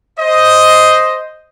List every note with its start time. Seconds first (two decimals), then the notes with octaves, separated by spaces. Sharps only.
0.20 C5 D#5